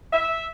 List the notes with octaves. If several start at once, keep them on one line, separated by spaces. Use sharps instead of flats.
E5